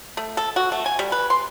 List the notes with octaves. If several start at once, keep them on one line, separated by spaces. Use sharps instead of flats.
A3
A4
F#4
A3
G#5
G3
B4
C6